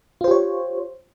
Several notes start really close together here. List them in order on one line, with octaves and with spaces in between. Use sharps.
F4 C5 G4 C#5